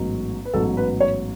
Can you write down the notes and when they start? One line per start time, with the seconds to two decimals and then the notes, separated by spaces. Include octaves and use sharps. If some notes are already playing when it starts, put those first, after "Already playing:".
Already playing: A1 G#2 F#3 B3
0.45 B4
0.54 A1 G#2 F#3 B3 A4
0.77 B4
1.00 C#5